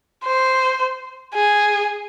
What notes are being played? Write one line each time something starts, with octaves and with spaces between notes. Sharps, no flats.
C5
G#4